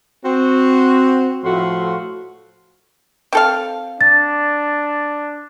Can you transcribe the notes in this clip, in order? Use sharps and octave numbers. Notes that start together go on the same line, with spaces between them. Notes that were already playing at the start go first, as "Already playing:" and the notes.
C4 F#4
A2 F3 A3 F#4 F5 C6
C4 A4 F5
D4 A6